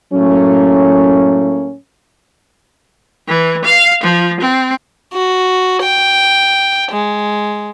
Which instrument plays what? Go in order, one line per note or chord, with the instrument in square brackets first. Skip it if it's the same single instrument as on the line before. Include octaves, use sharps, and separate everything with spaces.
[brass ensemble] A2 F#3 A3 A#3 C#4
[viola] E3
F5
F3
C4
[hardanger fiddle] F#4
G5
G#3